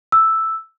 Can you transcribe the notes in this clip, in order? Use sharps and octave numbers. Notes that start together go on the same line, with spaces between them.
E6